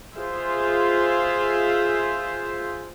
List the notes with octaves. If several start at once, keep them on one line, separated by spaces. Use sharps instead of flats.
F4 G#4 C5 E5